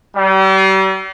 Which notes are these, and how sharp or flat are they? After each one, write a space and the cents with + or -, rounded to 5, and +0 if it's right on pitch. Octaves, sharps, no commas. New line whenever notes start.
G3 -40